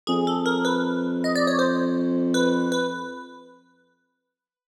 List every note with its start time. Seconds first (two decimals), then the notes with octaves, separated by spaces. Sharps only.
0.07 F2 G#4
0.27 A4
0.46 A#4
0.65 B4
1.24 D#5
1.36 D5
1.47 C#5
1.59 C5
2.34 B4
2.72 B4